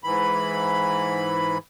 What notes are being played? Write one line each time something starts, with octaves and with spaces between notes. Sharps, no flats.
G#2 E3 B5